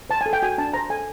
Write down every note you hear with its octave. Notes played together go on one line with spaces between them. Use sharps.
C5 A5
A4 G#5
G5
F#4 G#5
D4 A5
C5 A#5
A4 G#5